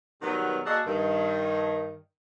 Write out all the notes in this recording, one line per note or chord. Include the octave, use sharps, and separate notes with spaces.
B2 D#3 F#3 G3 B3
A#3 F#4 G#4 A4 D5 D#5
G2 D#3